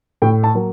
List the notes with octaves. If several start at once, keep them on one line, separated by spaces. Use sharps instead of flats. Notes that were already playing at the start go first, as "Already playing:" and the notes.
A2 G5
A5
F#3 A#3